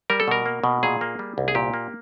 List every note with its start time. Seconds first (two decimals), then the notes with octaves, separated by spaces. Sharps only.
0.10 G3 A#4
0.20 A4
0.28 B2 A#4
0.46 A#3
0.64 B2
0.83 A#2 G#4
1.01 A#3
1.19 G3
1.38 C2
1.48 G#4
1.55 A#2 G4
1.74 A#3